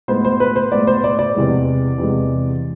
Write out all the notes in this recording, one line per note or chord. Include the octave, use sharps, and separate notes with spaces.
A2 G#3 B3 C5
C5
B4
C5
A2 G#3 B3 D5
C5
D5
D5
E2 C3 E3 G#3
E2 C3 E3 G#3